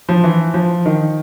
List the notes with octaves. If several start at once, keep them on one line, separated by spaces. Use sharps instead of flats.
F3
E3
F3
D#3